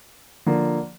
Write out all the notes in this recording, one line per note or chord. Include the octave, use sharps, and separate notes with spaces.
D3 F3 A#3